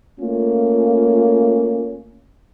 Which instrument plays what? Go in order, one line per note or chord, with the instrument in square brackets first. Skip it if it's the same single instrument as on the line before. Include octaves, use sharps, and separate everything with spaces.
[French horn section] A3 A#3 C#4 F4